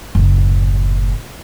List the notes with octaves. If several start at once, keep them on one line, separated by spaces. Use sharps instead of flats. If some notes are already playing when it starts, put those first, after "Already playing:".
F#1 A2